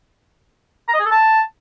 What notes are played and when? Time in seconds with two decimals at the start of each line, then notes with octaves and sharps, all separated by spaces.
0.88 A#5
0.94 D#5
1.00 G#4
1.05 A4
1.11 A5